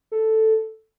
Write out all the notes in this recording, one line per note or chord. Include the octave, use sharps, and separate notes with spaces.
A4